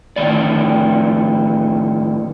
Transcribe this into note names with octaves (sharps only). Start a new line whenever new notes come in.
A2 D3 D#3 G#3 D5